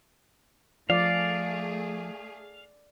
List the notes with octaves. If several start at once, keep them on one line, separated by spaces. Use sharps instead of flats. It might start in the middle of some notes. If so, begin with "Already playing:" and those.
F3 A3 G#4 D5 F5